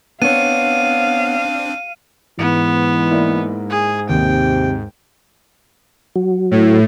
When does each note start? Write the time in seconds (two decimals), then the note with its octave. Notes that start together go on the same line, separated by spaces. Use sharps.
0.22 B3 C4 D4 C#5 F5 D#7
2.39 G#2 E3 B3 C#7
3.11 A#3 E4 D5
3.70 G#4
4.09 D#2 C3 G5
6.16 F#3
6.51 A2